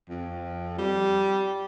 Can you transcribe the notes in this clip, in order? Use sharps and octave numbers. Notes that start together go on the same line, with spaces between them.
F2
G3